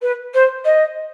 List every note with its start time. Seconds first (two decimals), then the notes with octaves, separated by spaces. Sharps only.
0.02 B4
0.34 C5
0.65 D#5